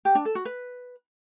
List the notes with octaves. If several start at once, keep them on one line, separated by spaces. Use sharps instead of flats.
G4
D4
A4
F#4
B4